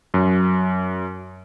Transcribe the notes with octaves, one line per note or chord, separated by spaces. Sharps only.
F#2